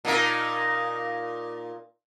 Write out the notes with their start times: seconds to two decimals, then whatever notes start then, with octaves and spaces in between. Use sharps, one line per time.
0.05 A#2 D#4 A#4